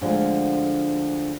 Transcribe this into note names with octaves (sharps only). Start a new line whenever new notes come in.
D2 D3 F3 G#3 D4